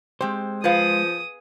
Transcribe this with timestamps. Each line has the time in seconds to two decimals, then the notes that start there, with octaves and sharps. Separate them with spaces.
0.21 G#3 C4 G4 C5
0.64 F3 G#4 B4 F5 D#6